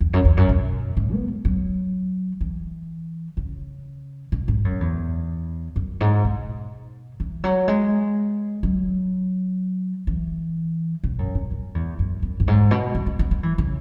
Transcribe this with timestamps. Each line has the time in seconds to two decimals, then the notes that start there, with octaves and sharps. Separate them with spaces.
0.01 E2
0.13 F#2
0.25 E2
0.37 F#2
0.49 B2
0.97 G#2
1.12 B3
1.45 F#3
2.41 E3
3.37 C#3
4.32 B2
4.48 G#2
4.65 F#2
4.80 E2
5.76 F#2
6.00 G#2
6.25 B2
7.20 E3
7.44 F#3
7.68 G#3
8.63 F#3
10.07 E3
11.04 B2
11.19 F#2
11.35 B2
11.51 F#2
11.75 E2
11.99 F#2
12.22 F#2
12.40 F#2
12.48 G#2
12.71 B2
12.95 E3
13.06 B3
13.19 B3
13.31 G#3
13.43 E3
13.58 C#3